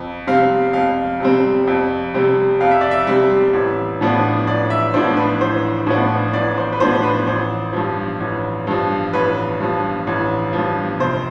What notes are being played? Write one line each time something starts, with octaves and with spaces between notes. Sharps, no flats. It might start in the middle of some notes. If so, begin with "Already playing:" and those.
Already playing: F2
C3 G3 C4 F5
F2 F5
C3 G3 C4
F2
C3 G3 C4
F2 F5
E5
D5
E5
C3 G3 C4
A1
A2 F3 B3 D4
A1 D5
E5
A2 F3 B3 D4 C5
B4
A1 C5
A2 F3 B3 D4
A1 D5
C5
B4
A2 F3 B3 D4 C5
B4
A1 C5
G2 F3
A1
G2 F3
A1 B4
G2 F3
A1
G2 F3
F1 C5